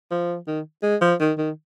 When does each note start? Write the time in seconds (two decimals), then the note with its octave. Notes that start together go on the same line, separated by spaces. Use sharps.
0.11 F3
0.47 D#3
0.83 G#3
1.01 F3
1.20 D#3
1.38 D#3